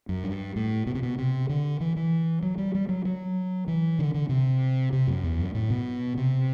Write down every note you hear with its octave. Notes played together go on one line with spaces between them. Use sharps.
F#2
G2
A2
B2
C3
B2
C3
D3
E3
E3
F#3
G3
G3
F#3
F#3
E3
D3
D3
C3
C3
F#2
E2
F#2
A2
B2
C3